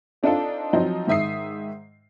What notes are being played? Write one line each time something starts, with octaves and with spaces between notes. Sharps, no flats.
C4 D4 D#4 F4 A4
F3 F#3 C4 D#4
G#2 D#3 E5 D#6 C7